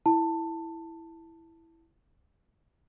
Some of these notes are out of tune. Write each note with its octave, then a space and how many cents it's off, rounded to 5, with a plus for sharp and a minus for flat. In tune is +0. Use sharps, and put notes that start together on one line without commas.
E4 +0 A5 +15